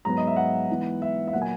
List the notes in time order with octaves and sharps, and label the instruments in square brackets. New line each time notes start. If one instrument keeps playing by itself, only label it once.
[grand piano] G#2 F#3 B3 A#5
D#5
E5
F#5
G#2 E3 B3
E5
E5
A#2 F#3 A#3 F#5
G#5